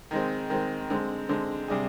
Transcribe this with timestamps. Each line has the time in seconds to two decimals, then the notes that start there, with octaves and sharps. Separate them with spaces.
0.11 D#3 G#3 C4
0.50 D#3 G#3 C4
0.90 D3 G#3 C4
1.29 D3 G#3 C4
1.68 C3 G3 D4 G#4